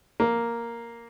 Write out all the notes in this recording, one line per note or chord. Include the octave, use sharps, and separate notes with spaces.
A#3